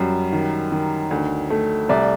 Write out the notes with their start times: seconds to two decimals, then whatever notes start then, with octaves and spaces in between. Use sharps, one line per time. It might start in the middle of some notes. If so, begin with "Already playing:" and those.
Already playing: F#2 G3
0.33 D#3
0.72 D#3
1.11 D2
1.50 A3
1.89 C2 D5 E5